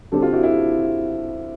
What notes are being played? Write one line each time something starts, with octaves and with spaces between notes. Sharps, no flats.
D3 G3 C4 G4 A4
F4 G4
E4 F#4
E4